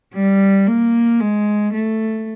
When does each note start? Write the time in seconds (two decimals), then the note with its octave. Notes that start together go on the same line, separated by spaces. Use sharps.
0.15 G3
0.68 A#3
1.21 G#3
1.74 A3